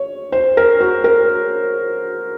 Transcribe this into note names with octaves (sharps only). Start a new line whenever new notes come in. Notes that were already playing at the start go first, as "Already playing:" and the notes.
Already playing: C#5
C5
A#4
F#4
A#4